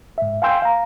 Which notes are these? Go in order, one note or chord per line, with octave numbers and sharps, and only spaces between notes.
G#2 E5
F5 G5 G#5 C6 E6 G6
F5 A#5